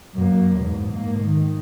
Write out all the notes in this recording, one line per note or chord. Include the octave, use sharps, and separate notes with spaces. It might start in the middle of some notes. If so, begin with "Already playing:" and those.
F#2 A#3
E2 G#2
G#2 A#3
D#3